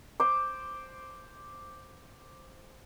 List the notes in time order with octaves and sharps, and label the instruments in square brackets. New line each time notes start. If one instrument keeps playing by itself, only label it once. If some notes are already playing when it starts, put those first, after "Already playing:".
[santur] C5 D6